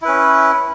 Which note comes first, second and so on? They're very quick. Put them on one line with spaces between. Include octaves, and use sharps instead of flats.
E4 B4 C#4